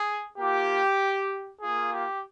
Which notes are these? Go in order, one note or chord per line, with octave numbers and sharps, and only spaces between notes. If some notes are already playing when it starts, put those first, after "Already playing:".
Already playing: G#4
A#3 F4 G4
A#3 F4 G#4
G4